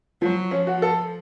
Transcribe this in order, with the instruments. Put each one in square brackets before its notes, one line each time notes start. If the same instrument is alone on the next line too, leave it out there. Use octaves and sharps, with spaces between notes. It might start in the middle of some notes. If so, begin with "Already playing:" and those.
[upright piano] F3 [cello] F#3
[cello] F3 [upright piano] C#4
[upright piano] F#4
A4